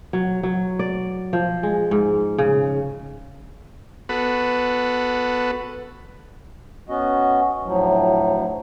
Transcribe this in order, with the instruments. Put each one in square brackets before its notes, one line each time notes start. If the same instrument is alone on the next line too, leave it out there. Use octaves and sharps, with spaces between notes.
[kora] F#3
F#3
D5
F3
G#3
G#2
C#3
[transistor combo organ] B3 F#4 A4 B4
[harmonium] B3 C#4 F#4 D#5
D2 A2 F3 F#3